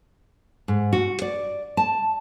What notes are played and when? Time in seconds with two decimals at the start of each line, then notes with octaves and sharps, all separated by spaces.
0.68 G#2
0.93 F#4
1.22 D5
1.77 A5